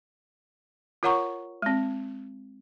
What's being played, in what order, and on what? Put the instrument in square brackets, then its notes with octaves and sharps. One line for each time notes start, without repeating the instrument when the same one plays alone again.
[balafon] F4 A#4 C#5 F#5 A#5 C#6
G#3 C4